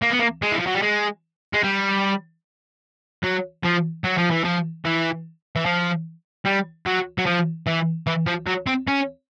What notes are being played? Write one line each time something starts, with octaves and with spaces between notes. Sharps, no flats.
A#3
B3
A#3
G#3
E3
F3
F#3
G3
G#3
G#3
G3
F#3
F3
F#3
F3
E3
F3
E3
E3
F3
G3
F#3
F#3
F3
E3
E3
F3
F#3
C4
C#4